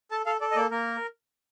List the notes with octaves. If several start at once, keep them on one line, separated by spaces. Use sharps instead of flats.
A4 A5
A4 F5
A4 D5
D#5
A#3 D5
A#3 A#4